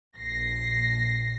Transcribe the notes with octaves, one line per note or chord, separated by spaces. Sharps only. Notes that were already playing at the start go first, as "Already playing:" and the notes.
A#1 A#6 C7